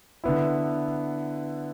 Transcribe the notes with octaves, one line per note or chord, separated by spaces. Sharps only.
D3 B3 E4